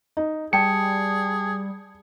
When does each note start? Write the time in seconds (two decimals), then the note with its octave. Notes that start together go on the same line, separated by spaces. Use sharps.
0.17 D#4
0.53 G3 G#4 G5 A5 C#7